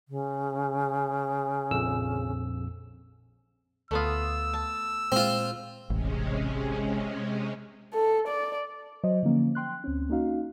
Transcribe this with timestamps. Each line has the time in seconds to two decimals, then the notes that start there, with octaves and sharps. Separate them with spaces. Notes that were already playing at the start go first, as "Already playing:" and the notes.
0.08 C#3
1.71 A#1 F2 E6
3.91 D2 A3 B3 F4 D#6 E6
4.54 A5
5.12 A#2 G#3 C4 F4
5.90 E1 A1 C3 G#3 C#4
7.93 A4
8.27 D5
9.03 F#3 C5 D#5
9.23 D3 F3 A#3 C#4
9.55 G5 C6 F#6
9.84 D2 C4 C#4
10.10 A#3 C#4 D#4 F#4 F5